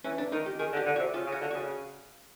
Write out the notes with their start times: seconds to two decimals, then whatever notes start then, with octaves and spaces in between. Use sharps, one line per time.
0.04 E3 C#4
0.18 D4
0.32 D#3 D#4
0.46 G4
0.59 D#3 G#4
0.73 D3
0.77 G4
0.86 D3
0.96 F#4
1.00 C3
1.14 C#3 F4
1.27 C#3
1.32 F#4
1.41 D3
1.51 C#3 F#4